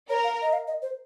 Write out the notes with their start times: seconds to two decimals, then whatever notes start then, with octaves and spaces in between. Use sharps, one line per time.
0.10 A#4 C#5
0.24 F5
0.42 D#5
0.53 F5
0.68 D#5
0.82 C5